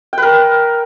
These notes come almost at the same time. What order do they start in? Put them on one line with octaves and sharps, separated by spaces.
G5 B4 A#4